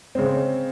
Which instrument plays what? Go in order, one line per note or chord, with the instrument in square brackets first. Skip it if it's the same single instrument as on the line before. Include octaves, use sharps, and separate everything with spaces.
[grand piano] C#3 G#3 C4